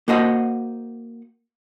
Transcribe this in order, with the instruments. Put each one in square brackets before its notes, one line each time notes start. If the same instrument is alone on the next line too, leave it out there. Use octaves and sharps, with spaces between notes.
[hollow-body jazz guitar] A#3 F#4 C5 D#5 F#5